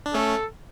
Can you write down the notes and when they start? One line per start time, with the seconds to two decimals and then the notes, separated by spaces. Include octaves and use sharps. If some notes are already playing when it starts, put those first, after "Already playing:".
0.06 D4
0.14 A3 C#4 A4